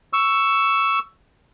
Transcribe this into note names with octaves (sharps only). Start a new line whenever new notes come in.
C#6 E6